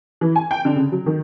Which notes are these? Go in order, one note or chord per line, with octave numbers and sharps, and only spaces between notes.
E3
G#5
G5
D3
C#3
F#3
D#3